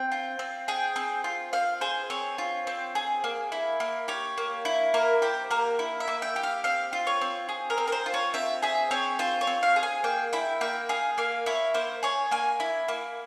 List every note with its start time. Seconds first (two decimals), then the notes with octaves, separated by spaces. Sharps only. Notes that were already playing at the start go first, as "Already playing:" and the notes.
Already playing: C4 G5
0.12 F4
0.39 C4
0.68 G#4 G5
0.96 C4
1.24 F4
1.53 C4 F5
1.81 G#4 C5
2.10 C4 C#5
2.38 F4
2.67 C4
2.95 G#4
3.24 A#3
3.52 E4
3.80 A#3
4.08 G4 C#5
4.38 A#3
4.65 E4
4.94 A#3 A#4
5.22 G4 C5
5.51 A#3 A#4
5.79 E4
6.00 E5
6.08 A#3
6.22 G5
6.36 G4
6.43 F5
6.64 C4 F5
6.93 F4
7.07 C#5
7.21 C4
7.49 G#4
7.70 A#4
7.78 C4
7.88 A#4
7.92 C5
8.06 F4
8.14 C#5
8.34 C4 E5
8.62 G#4 E5
8.91 C4 C#5
9.19 F4 C5
9.41 C#5
9.47 C4
9.63 F5
9.76 G#4
9.83 G#5
10.04 A#3 G5
10.33 E4 G5
10.61 A#3 G5
10.89 G#4 F5
11.18 A#3 F5
11.46 E4 C#5
11.74 A#3 C5
12.03 G#4 C#5
12.31 A#3 G#5
12.60 E4
12.88 A#3